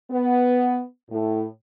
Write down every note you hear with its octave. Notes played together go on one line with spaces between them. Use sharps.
B3
A2